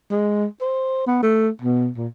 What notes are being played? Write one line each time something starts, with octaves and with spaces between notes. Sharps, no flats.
G#3
C5
B3
A3
B2
A#2